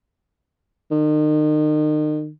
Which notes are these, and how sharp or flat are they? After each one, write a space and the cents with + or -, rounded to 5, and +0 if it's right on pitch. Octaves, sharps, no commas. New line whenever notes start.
D#3 -35